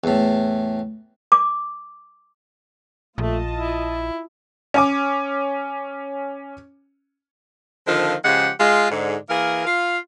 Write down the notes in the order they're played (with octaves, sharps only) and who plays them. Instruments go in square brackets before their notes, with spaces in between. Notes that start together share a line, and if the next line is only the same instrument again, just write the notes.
[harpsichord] E2 A2
[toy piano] D6
[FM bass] A#1 [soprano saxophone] A3 [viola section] F4 D#5 A5
[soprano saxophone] E4
[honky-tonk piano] C#4 G#5 D6
[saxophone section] D3 D#3 F3 C4 F4
C#3 F3 G#3 G4 F#5
G#3 F4
G#2 D3
E3 A#3 G#4 A#4
F4 F5